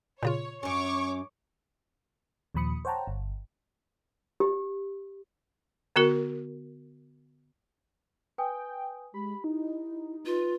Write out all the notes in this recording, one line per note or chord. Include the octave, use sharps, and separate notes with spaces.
A#2 C#3 F4 C#5
F#2 C#4 C#5 C#6 D6
D#2 A#2 F3 B5 D#6 C#7
C5 C#5 F#5 G5 A5 A#5
G1
G4
D3 B3 F#4 A#4
B4 G5 G#5 D#6
G#3 G4 B5
D#4 E4
F4 B4